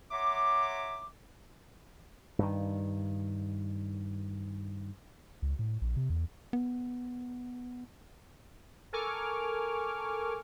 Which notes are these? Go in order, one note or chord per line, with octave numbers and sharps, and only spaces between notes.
C#5 E5 F#5 A#5 C6 D6
G2 D#3
C#2
A2
A#1
C3
E2
B3
A4 A#4 G#5 C#6 D6 F6